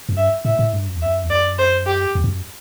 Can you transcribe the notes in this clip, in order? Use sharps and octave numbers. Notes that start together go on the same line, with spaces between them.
F#2
G2 E5
A2 E5
A2
G2
F#2
E2
F#2 E5
E2
F#2 D5
C5
G4
E2
G2
F#2